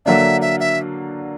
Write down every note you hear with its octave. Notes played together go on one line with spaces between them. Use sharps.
D3 F#3 A#3 D4 E5
E5
E5